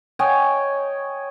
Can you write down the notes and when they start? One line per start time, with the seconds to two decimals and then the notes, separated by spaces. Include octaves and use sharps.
0.19 C#5 D#5 G5 G#5